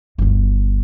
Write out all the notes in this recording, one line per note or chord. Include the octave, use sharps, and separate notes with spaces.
G1 D2